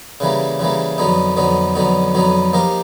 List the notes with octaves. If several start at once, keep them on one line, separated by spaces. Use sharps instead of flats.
C#3 E3 G3 A#3
C#3 E3 G3 A#3
F2 D3 F#3 B3 D#4
F2 D3 F#3 B3 D#4
F2 D3 F#3 B3 D#4
F2 D3 F#3 B3 D#4
F3 A#3 D#4 G4 A#4